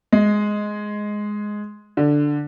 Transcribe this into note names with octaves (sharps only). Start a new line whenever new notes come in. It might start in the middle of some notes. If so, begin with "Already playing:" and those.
G#3
D3